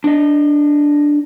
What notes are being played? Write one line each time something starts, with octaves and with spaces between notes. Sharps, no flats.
D4 D#5